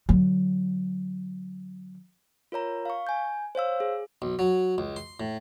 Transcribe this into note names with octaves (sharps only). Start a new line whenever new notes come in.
D3 F#3
F4 A#4 C#5 A#5
F5 C#6
G#5 G6
C5 C#5 F5 E6
G#4
B1
F#3
C#2
C6
A2